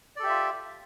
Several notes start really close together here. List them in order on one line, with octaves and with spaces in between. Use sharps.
D5 A4 G4 E5 F4